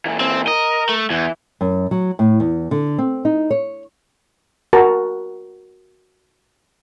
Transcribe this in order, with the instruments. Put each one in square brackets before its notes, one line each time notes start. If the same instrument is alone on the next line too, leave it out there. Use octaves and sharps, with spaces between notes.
[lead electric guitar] A#2 E3
[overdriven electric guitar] C4
[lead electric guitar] A#4 [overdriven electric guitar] D#5
[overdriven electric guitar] A3
[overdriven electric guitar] E2 [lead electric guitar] E3
[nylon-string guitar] F#2
F#3
A2
E2
D3
C4
D#4
C#5
[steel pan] F#4 A#4 A5